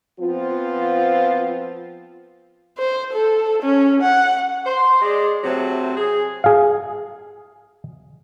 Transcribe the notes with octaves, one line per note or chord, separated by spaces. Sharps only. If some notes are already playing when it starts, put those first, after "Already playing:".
F3 B3 C4 F4
C5
A4
C#4
F#5
C5 C6
G#3 D5
C3 F#3 A3 C4
G#4
G#4 F5